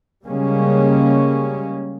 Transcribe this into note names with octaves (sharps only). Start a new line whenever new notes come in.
C#3 G3 G#3 A#3 C#4